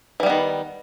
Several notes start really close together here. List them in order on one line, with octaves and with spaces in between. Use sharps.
E3 G3 B3 D#3